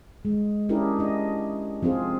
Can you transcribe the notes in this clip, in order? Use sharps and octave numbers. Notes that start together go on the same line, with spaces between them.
G#3
C#4 D4 E4 G4 G#4 A#4
D4 D#5
F3 C4 F4 G#4